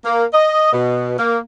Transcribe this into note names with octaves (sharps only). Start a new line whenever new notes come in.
A#3
D#5
B2
A#3